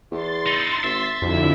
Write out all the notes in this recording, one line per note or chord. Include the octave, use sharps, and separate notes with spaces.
E2 C6 A6
D#4 E4
G#1 E5
B1 F2 D3 E4